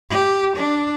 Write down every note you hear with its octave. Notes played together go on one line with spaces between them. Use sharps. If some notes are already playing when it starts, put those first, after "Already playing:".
G4
D4